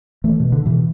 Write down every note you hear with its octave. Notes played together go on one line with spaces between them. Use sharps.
E3 A3
B2
D3
B2 E3